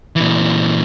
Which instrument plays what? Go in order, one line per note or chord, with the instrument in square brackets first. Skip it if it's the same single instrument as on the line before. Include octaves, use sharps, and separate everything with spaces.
[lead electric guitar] A#2 E3